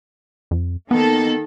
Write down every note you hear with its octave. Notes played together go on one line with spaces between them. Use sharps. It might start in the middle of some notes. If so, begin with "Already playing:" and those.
F2
D#3 A#3 B3 A4